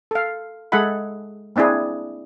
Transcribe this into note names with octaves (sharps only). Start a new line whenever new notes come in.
A4 F5
G#3 G#4 A4 E5 F#5 B5
A#3 C4 D4 E4 G#4